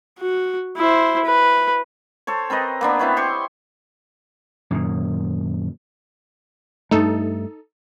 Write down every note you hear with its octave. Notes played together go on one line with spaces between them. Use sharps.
F#4
E4 C5
B4
A4 C5 C#5
C4 A#4 B4 D#5
A#3 B3 D4
C4 E4 B4 C#5
G4 C5 C6 C#6
F#2 A#2 D#3
G2 A3 D#4 A4